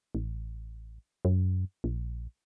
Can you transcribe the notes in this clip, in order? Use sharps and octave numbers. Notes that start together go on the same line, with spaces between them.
A1
F#2
A#1